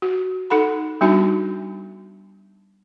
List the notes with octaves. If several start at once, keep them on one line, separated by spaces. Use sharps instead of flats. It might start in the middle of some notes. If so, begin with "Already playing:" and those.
F#4
D#4 A4 F#5 B5
G3 B3 D4 D#4 F#4 A5